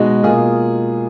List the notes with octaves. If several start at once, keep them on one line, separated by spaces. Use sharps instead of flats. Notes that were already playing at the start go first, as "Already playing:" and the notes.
Already playing: B2 G#3 D#4 F#4
B2 A#3 F4 G#4